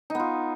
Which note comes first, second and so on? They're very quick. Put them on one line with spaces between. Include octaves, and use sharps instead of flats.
D#4 B3 F4